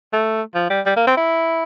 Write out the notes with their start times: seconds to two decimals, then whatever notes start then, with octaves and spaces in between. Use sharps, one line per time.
0.13 A3
0.55 F3
0.70 G3
0.86 G3
0.96 A#3
1.07 C4
1.17 E4